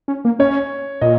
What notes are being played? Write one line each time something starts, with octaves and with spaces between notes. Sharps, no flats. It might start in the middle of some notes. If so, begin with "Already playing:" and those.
C#4
A#3
C#4 C#5
A#2 D#5